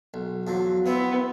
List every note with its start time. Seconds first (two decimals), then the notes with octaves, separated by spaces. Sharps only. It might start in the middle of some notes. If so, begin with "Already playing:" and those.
0.14 B1
0.47 E2 F3 F#3
0.86 E3 B3 C4 E4